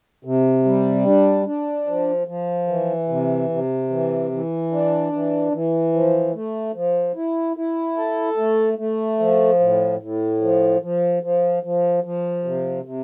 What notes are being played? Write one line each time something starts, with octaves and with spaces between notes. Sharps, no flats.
C3
G3
D4
D4
F3
F3
E3
C3
C3
E3
E3
D4
E3
E3
F3
A3
F3
E4
E4
A4
A3
A3
F3
A2
A2
F3
F3
F3
F3
F3
C3
C3